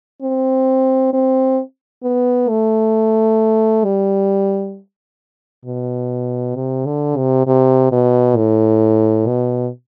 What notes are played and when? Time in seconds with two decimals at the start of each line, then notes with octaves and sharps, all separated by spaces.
0.22 C4
1.13 C4
2.03 B3
2.49 A3
3.84 G3
5.65 B2
6.56 C3
6.86 D3
7.17 C3
7.47 C3
7.92 B2
8.37 A2
9.27 B2